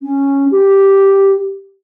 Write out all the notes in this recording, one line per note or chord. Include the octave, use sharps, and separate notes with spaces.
C#4
G4